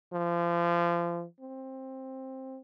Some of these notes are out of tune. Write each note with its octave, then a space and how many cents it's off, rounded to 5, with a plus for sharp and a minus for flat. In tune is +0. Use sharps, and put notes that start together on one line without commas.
F3 -30
C4 +15